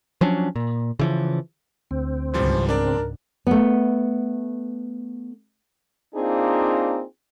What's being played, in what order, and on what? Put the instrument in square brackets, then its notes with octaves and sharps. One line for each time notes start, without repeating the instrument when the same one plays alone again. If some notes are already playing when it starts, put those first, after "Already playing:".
[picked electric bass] F3 F#3 C#4 D4
A#2
C#3 E3 F3
[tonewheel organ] D2 C4
[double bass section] G#1 C#2 [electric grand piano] E3 F3 G3 [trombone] C5
[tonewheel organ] C#3 C4 [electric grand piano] D4 D5 [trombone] A#4
[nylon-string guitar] A3 B3
[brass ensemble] A#3 C4 D4 D#4 F4 G#4